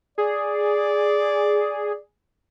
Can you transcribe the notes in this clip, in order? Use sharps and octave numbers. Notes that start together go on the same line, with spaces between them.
G#4 D5